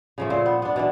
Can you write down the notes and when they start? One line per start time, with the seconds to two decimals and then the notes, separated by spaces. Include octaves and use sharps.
0.18 C#3 F3 A3
0.30 A#2 C5
0.46 B3
0.62 B3 D4
0.76 B2 E3 D4